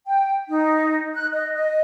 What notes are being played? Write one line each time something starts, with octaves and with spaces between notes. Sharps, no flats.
G5
D#4
F#6
D#5
D#5